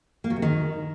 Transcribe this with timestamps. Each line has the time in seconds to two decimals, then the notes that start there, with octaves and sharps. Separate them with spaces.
0.24 A#3
0.30 F#3
0.36 C3
0.42 D#3